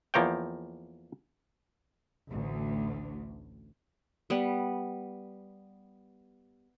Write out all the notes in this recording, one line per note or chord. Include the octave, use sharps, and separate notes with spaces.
E2 F3 A#3 C#5 G5
A1 D2
G3 B3